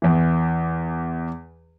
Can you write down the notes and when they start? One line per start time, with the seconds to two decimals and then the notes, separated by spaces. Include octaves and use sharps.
0.02 E2 E3